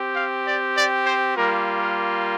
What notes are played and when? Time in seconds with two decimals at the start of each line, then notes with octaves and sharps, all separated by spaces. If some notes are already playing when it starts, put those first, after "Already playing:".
Already playing: C4 G4
0.14 F5
0.45 D5
0.75 D5
1.04 C5
1.35 G3 A#3 F4 A#4
1.80 A#4